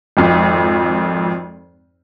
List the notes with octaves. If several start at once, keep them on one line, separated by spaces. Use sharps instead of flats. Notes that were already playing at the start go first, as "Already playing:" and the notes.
G#1 F2